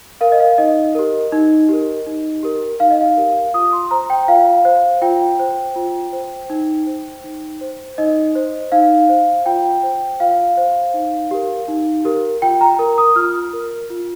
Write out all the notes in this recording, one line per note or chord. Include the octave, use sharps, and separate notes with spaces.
A#4 F5
D#5
F5
D#4 D#5
G4 A#4
D#4
G4 A#4
D#4
G4 A#4
D#4 F5
D#5
F5
G4 A#4
F4 D#6
C6
C6
C5 A#5
G5
F4 F5
C5
F4 G5
C5
F4
C5
D#4
C5
D#4
C5
D#4 D#5
C5
D#4 F5
C5
F4 G5
C5
F4 F5
C5
D#4
G4 A#4
D#4
G4 A#4
F4 G5
A#5
A#4
D#6
F4 F6
A#4
F4